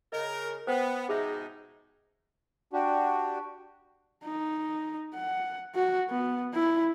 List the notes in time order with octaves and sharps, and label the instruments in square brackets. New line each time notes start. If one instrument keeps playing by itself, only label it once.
[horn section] C#3 A#4 [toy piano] D#5
[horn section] B3 [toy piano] C5 G5
[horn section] G#2 B2 D#4 [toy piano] G#4 E5
[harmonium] D4 F#4 G4
[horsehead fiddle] D#4
F#5
F#4
B3
E4